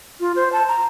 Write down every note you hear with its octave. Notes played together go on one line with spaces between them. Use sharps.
F4
C5
A5
A#5